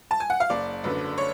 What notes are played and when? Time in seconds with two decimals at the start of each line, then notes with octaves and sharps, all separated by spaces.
0.11 A5
0.20 G#5
0.30 F#5
0.40 F5
0.50 F#1 D5
0.84 F#2 D3 B4
1.18 C#5